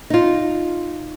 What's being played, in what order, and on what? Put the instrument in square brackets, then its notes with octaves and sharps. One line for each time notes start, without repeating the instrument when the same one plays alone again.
[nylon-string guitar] D#4 F4